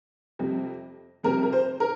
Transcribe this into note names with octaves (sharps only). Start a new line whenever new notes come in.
F2 C3 G3
F2 C3 G3 A#4
A#4
C5
A#4